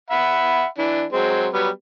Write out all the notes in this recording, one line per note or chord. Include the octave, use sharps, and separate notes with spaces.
E5 F#5 B5
E3 D4
F#3 G#3 C4
F#3 G3 B3